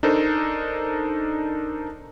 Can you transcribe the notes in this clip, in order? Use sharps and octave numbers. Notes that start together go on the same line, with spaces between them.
D4 D#4 A4 A#4 C5